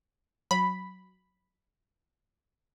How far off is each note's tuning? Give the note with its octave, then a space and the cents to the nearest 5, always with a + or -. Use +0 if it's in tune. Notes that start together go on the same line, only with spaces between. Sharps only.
F#3 +0 B5 +0